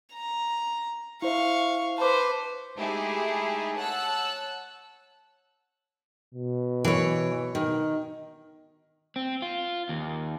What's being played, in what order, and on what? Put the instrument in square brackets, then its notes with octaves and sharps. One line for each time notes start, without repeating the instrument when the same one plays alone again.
[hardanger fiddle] A#5
[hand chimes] E4 C5 E5 [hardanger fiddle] F5 C#6
[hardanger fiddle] B4 C5 [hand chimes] A5 B5 D6
[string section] G#3 A3 D#4 E4 G4 G#4
C#5 F#5 A5 E6 F#6
[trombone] B2
[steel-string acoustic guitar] E3 C#5
D#3
[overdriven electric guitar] C4
F4
D#2